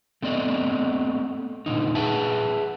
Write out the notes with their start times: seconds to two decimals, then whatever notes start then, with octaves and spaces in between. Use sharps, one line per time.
0.22 A3 B3 C4 D5 D#5
1.66 A#2 D3 D#4
1.95 G#4 B4 E5 F#5 A5